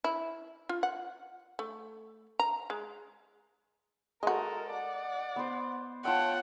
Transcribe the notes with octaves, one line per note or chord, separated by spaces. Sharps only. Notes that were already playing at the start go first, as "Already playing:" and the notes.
E4
F4
F#5
A3
A#5
G#3
G#3 F#4 A4 A#4 D#5
D5 F#5
B3 C5
F4 C#5 F#5 G5 A5 E6